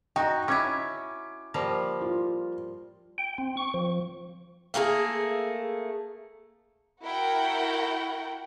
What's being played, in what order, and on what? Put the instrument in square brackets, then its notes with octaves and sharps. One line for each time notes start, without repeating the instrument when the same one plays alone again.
[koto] D#4 F#4 [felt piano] G5 A#5
[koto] C#4 E4 [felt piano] D6 G#6
[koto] F3 G3 A#3
[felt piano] F4
[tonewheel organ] G5
C4
C#6
F3
[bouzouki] A3 A#3 F#4 G#4
[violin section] E4 F#4 A#4 F#5 G5